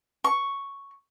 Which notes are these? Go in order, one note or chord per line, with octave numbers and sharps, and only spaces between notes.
C#6